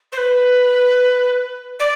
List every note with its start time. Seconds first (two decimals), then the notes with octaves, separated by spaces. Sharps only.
0.12 C5
0.17 B4
1.79 D5